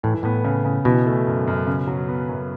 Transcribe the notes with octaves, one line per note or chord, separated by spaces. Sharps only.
A2 E3
A2 B3
C#3
C#3
B2 E3
A3
F#2
F#2
C#3
F#3
B3
F#2